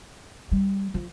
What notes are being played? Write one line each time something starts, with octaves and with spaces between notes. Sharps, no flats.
G3
F3